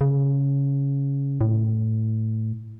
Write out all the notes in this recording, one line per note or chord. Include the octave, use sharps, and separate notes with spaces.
C#3
A2